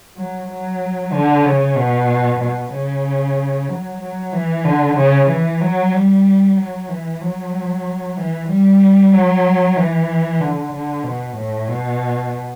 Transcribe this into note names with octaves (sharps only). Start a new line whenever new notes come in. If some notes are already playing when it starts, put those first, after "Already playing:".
F#3
F#3
D3
C#3
B2
B2
C#3
F#3
F#3
E3
D3
C#3
E3
F#3
G3
F#3
E3
F#3
E3
G3
F#3
E3
D3
D3
B2
A2
B2